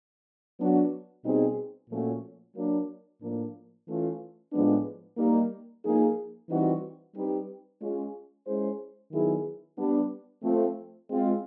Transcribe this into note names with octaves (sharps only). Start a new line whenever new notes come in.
F#3 B3 D4 F#4
B2 G3 C4 D#4 G#4
A#2 F3 A3 C#4 F#4
F#3 A#3 D4
A2 F3 A#3 D4
E3 A3 C#4 F4
A2 F3 G#3 B3 D4
G3 A#3 D#4
F3 A#3 D#4 G#4
E3 G3 C4 D#4 F#4
G3 C4 D#4 G4 B4
G#3 C#4 F4
G#3 C#4 E4 G#4 C5
D#3 F#3 B3 E4 G#4
G3 B3 D4
F3 A3 C4
G#3 C4 F4